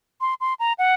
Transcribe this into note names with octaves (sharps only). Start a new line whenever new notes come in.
C6
C6
A#5
F#5